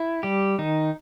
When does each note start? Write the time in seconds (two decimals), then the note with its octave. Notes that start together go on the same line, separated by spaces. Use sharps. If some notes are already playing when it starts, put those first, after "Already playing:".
Already playing: E4
0.23 G3 G4
0.58 D#3 D#4